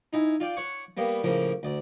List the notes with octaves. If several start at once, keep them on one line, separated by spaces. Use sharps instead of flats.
D#4 E4 G#5
F4 D5 G5 D6
C#5 F#5 C#6 D6
G3 A#3 B3
A2 C#3 F3 A#3
D2 D5